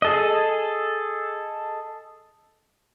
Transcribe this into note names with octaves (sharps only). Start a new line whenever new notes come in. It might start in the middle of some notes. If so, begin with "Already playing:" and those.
G#4 A4 D#5